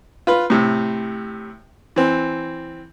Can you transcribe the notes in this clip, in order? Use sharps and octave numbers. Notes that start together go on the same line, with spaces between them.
F4 B4
A2 C3
E3 C4